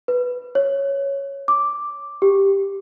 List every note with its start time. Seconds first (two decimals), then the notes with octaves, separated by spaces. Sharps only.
0.08 B4
0.55 C#5
1.48 D6
2.22 G4